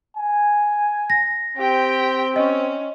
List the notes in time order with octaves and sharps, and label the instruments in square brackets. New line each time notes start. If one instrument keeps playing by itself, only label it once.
[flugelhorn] G#5
[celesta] A#6
[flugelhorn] C4 [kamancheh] G4 G5
[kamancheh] C#4 [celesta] D#5